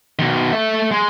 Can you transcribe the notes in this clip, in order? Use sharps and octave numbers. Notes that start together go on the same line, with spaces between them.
B2 D#3
A3 E5
G#3